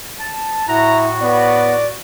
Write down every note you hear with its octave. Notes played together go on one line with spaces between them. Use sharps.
A5
A2 E4 F#4 A#5
B3 D5